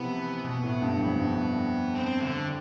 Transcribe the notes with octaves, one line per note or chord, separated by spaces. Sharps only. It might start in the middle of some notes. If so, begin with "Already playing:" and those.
Already playing: C3 E3 F3 B3
B2
A2
G2
F2
G2
C4
D3